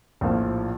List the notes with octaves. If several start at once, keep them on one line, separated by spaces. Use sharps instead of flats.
A#1 A2 F3 A#3